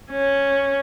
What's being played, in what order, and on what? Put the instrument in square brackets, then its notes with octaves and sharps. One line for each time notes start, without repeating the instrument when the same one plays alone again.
[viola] C#4